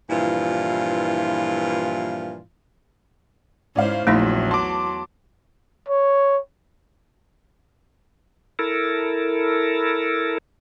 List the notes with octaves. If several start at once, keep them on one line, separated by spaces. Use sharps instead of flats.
G2 A#2 E3 F3 E4 F4
G#2 C#4 E4 C5 D5 F5
A#1 E2 F#3 A3 D#4 E4 E5 C6
A5 C6 D6
C#5
E4 A4 A#4